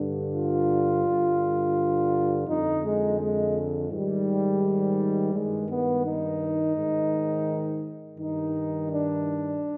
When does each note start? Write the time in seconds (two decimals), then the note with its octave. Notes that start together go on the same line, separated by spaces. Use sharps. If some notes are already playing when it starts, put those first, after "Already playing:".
Already playing: G2 D3
0.32 F4
1.04 G2 D3
2.47 F2 D3 D#4
2.83 G#3
3.18 G#3
3.90 G#2 D#3 G3
5.33 G2 D#3 G#3
5.69 B3
6.04 D#4
6.75 G#2 D#3
8.19 G2 D#3 D#4
8.90 D4